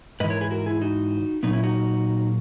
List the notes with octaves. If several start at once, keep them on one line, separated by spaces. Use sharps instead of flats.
G#2 E3 B4 D#5
A#4 C#5
G#4 B4
F#4 A#4
E4 G#4
D#4 F#4
A#2 F#3 B3 D#4
C#4 E4
D#4 F#4